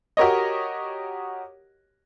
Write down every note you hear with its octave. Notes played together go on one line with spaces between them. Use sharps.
F#4 G4 A#4 C#5 D#5